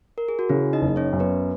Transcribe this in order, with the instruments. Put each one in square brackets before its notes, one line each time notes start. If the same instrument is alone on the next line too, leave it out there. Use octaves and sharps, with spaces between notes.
[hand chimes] A#4
G#4
F#4
[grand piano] C#3 [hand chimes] E4
[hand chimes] D#4 D#5
[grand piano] F#1
[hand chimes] C#4 C#5
[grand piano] F#2
[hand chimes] B3 B4